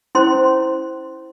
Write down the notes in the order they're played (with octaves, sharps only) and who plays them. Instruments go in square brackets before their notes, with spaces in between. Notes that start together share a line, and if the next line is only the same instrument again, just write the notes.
[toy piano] C#4 E4 C5 C6